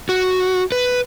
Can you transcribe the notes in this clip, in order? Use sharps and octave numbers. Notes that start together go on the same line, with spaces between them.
F#4
B4